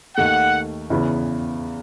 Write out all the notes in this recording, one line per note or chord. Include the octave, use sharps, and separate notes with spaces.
D#2 D#3 A3 F#5
E2 C#3 E3 B3 E4